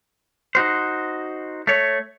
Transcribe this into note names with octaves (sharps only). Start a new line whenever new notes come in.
D#4 F#4 C5
A3 C#5